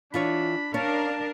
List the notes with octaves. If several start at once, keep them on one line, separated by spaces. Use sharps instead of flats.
E3 D4 F4 C#5 B5
C#4 D4 A#4 F5 A5